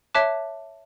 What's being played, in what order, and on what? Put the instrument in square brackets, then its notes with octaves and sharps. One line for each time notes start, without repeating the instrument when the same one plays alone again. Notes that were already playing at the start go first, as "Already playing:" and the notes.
[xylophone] C#5 E5 A5 D6 F#6